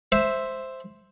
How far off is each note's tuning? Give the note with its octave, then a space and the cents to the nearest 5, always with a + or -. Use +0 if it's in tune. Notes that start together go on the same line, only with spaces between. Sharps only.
C5 +0 E5 +0